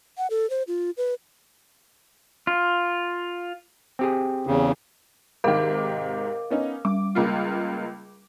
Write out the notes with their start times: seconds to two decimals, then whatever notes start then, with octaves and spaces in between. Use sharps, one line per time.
0.18 F#5
0.30 A4
0.50 C5
0.68 F4
0.97 B4
2.47 F4
3.99 C4 G4 G#4
4.47 E2 C#3
5.44 G#2 C3 D#3 A#4 F5 D6
6.50 B3 C#4 D#4
6.85 G3 D6
7.15 C#2 A#3 F4